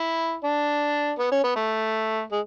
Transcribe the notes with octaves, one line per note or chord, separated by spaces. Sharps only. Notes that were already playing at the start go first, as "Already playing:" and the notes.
Already playing: E4
D4
B3
C#4
B3
A3
G#3